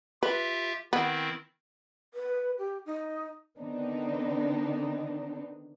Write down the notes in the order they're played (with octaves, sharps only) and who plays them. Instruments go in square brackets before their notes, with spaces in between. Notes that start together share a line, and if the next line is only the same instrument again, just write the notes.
[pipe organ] F4 G4 E5 [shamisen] B4
[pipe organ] D#3 C4 E4 [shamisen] B3
[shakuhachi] B4
G4
D#4
[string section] D3 D#3 B3 C4 D4 D#4